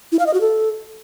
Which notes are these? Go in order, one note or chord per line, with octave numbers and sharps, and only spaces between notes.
E4
F5
D#5
F#4
A4